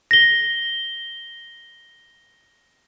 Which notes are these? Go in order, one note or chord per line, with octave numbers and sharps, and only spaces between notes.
A#6 G7